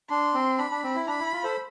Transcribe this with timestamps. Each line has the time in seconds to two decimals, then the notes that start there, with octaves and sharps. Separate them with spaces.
0.10 D4 C6
0.34 C4
0.58 D4 B5
0.71 D4
0.83 C4
0.95 E4
1.07 D4 B5
1.19 E4
1.32 F4
1.44 A4 C5